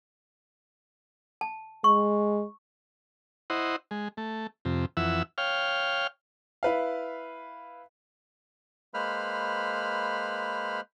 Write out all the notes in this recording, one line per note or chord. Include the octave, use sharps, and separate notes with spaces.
A5
G#3 C#6
E4 C5 D#5 F#5
G#3
A3
F2 C3
F2 E3 E5 F#5 E6
C#5 F5 G5 F6
E4 B4 F5
G#3 A#3 B4 C5 B5 F6